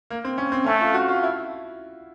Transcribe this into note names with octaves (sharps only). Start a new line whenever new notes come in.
A#3
C4
C#4
C4
A3 C#4
F4
F#4
F4
E4